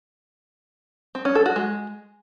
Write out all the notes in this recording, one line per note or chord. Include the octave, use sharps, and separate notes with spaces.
C4
C#4
A4
F#4
G#3